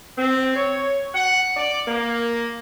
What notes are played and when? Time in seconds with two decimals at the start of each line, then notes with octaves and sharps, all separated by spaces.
0.18 C4
0.56 C#5
1.14 F#5
1.56 D5
1.88 A#3